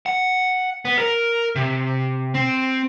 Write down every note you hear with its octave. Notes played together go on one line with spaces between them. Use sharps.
F#5
B3
A#4
C3
C4